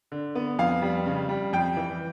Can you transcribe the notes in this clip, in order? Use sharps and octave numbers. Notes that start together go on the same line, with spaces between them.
D3
B3
F2 F5
G3
C#3
G3
F2 G5
E3